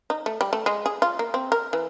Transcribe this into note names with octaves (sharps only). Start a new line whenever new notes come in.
D#4
A3
G3
A3
G#3
G#4
F4
A#3
C4
A#4
E3